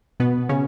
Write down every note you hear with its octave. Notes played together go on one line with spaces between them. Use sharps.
B2 B3
C#3 C#4